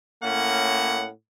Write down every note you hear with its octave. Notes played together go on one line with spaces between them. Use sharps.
A2 A#3 C#4 F#5